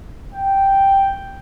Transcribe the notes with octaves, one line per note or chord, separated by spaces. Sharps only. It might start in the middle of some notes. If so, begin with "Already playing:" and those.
G5